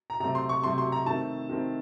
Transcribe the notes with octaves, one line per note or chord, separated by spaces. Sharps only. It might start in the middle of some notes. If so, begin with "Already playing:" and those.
A#5
C3 F#3 A3 C4 A#5
C6
C#6
C3 F#3 A3 C4 C6
C6
A#5
D#3 A3 C4 A5
D#3 A3 C4